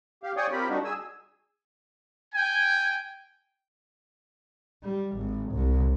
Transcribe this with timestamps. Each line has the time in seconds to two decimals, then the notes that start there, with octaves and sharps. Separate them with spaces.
0.23 G4 F5
0.37 C#5 D5 G5 G#5 C#6 D#6
0.51 C4 F4 G4 A#4 B5
0.69 G3 D4 D#4 F#4
0.84 G#4 G#5 E6
2.34 G5 G#5
4.84 G3
5.17 G#1
5.54 C2